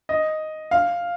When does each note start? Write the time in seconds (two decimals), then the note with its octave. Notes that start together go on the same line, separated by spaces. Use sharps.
0.09 D#5
0.71 F5